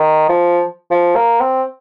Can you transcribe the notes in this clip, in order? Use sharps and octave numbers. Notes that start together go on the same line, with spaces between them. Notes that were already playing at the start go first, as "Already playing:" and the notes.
Already playing: D#3
F3
F3
A#3
C4